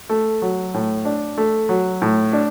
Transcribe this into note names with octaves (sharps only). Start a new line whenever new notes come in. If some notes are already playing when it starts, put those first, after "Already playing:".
A3
F#3
A2
D4
A3
F#3
A2
D4